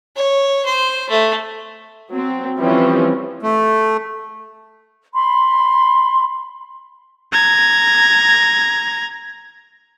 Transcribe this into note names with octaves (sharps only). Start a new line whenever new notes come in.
C#5
C5
A3
F#3 C4
E3 F3 G3 C4 C#4
A3
B5 C6
A#5 G#6